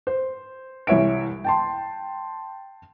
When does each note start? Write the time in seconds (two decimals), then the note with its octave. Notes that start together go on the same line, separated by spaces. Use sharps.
0.07 C5
0.87 C2 E3 C#5 E5 D7
1.44 G5 A5 C6